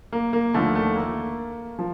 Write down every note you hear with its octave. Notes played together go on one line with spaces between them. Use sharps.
A#3
A#3
D#2 D3 F3 A3
A3
A#3
F3